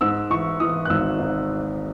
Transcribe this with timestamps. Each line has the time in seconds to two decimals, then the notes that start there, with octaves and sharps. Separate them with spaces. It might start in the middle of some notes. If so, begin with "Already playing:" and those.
0.01 G#2 E6
0.30 E3 C#6
0.60 E3 D#6
0.85 F#6
0.90 G#1 E6
1.19 G#1